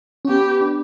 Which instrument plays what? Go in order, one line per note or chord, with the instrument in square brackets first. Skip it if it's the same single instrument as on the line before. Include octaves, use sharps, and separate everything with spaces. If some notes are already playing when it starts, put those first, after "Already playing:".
[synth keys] C#4
[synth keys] B3 [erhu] G4
[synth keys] B3
D4